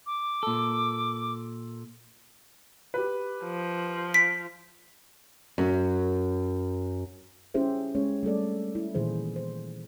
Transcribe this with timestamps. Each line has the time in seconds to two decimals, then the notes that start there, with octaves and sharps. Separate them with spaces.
0.06 D6
0.43 A#2 A4
2.94 G4 B4
3.44 F3
4.14 B6 D7
5.58 F#2
7.54 C#4 E4 G4 G#4 C5 E5
7.95 G#3 C#4 G#4 C#5
8.23 G3 A3 A4 D5
8.75 E4
8.95 A#2 D#3 E3 G#4 C5
9.36 C5